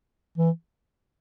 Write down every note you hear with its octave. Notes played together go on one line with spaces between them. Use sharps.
E3